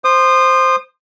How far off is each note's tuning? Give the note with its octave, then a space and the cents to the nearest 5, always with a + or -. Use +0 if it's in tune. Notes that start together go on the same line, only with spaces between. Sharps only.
C5 +0 D#6 -30